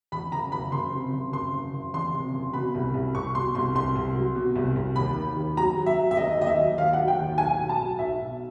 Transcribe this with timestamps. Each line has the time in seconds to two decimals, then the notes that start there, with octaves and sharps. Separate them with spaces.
0.12 E2 B5
0.32 F#1 A#5
0.52 F#1 B5
0.72 F#1 C6
0.93 C3
1.13 F#1
1.32 F#1 C6
1.53 F#1
1.73 F#1
1.94 E2 C6
2.13 C3
2.34 F#1
2.53 B2 B5
2.75 C2
2.94 C2
3.15 C2 C#6
3.35 B2 C6
3.55 C2 C6
3.75 C2 C6
3.95 C2
4.15 F#3
4.35 B2
4.55 C2
4.76 C2
4.96 D#2 B5
5.16 D#3
5.36 D#2
5.57 F#3 A#5
5.77 F#3
5.86 E5
5.98 F#3
6.11 E5
6.17 D#2 D#5
6.37 D#2 D#5
6.47 E5
6.58 F#3
6.77 D#2 F5
6.93 F#3 F#5
7.08 G5
7.19 D#2
7.38 B1 G#5
7.58 B1
7.69 A5
7.79 F#3
7.99 B1 E5
8.20 B2